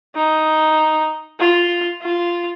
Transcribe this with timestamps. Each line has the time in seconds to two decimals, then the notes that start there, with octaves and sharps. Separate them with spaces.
0.15 D#4
1.39 F4
2.02 F4